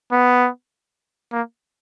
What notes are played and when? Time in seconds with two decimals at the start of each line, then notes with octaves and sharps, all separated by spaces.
0.12 B3
1.32 A#3